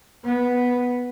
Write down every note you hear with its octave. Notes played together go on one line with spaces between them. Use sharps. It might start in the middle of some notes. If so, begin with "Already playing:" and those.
B3